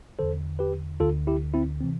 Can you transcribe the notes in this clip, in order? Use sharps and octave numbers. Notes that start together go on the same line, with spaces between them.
E2 D3 A4 C5
G4 B4
D2 D3 F4 A4
E4 G4
C4 E4
C3 E3 C4